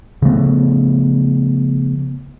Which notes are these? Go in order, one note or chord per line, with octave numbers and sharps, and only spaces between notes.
C#3 F3 A3 B3